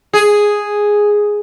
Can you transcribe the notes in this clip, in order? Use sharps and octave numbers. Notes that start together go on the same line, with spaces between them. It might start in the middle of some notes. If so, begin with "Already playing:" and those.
G#4